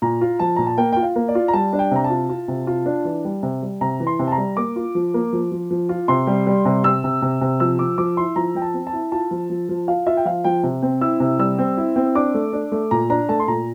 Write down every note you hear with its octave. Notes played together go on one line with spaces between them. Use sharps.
A#2 A#5
F4
F3 A5
A#2 A#5
A5
A#3 G5
F4 G5
F5
A#3
D5
F4
A#5
G3 A5
D4
G5
C3 A#5
A5
F4
F4
C3
F4
D4
E3
G3
C3
G3
C3 A#5
E3
C6
C3
A5
A#5
G3
A#3 D6
F4
F3
A#3
F3
F3
F3
F4
C3 C6
G3
G3
C3
C3 E6
C3
C3
C3
F3 E6
F3 D6
F3 D6
E4 C6
F3 A#5
F3 G5
A5
C4
A5
E4
F4 A5
F3
F3
F3
F4 F5
F4 E5
G5
F3 F5
F3 G5
C3
C4
E4 E6
C3
G3 E6
C4
E4
C4
D4 D6
A3
D4
A3
A#2 A#5
D4 A#5
A3 A5
C6
A#2 A#5